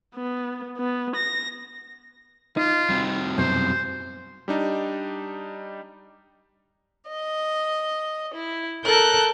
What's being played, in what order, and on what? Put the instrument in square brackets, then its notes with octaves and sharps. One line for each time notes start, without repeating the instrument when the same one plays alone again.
[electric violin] B3
B3
A#6
[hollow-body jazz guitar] D#4 [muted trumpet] F4
[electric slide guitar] G3 C4 F#4
[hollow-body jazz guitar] F#2 B2 [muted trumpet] C5
[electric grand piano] G3 D4 D#4
[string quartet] D#5
E4
A4 A#4 A5 F#6 G6